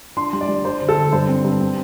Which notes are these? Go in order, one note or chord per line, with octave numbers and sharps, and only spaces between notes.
D4 C6
G3
D5
G3
D4 C5
D3
A4
D3
G2 C5
C4
G2
C4